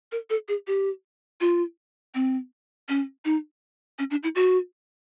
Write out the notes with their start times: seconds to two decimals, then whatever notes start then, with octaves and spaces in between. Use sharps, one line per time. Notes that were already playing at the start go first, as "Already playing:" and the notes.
0.12 A#4
0.30 A4
0.48 G#4
0.67 G4
1.41 F4
2.15 C4
2.89 C#4
3.25 D#4
3.99 C#4
4.11 D4
4.23 E4
4.35 F#4